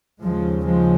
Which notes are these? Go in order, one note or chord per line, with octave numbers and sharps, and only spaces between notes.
D#2 C#3 F3 G#3
F3 G#3